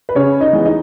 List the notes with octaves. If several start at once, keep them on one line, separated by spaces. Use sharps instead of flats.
B4
C#3 C#4 C#5
D#4 D#5
E3 G#3 B3
D#4 D#5